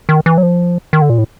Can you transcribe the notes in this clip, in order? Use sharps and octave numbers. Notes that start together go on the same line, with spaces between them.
D#3
E3
F#3
F3
D#3
D3
A#2
A2